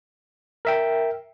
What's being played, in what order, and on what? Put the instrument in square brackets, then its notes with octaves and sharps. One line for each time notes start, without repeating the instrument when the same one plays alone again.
[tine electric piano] A#4 E5 G5